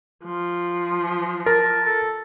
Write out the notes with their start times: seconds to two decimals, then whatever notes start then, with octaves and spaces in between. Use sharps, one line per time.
0.24 F3
1.46 A#4 A5
1.86 A4